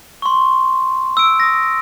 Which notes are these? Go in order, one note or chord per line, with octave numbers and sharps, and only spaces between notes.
C6 C#6
E6 D7
D#6 A#6